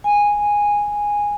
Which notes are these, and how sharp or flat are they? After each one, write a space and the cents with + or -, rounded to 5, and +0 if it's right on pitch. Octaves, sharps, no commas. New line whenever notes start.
G#5 -10